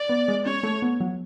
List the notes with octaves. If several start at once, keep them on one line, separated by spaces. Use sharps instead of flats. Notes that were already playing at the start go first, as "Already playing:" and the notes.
Already playing: D5
B3
G#3
C#4 C#5
A3
B3
F#3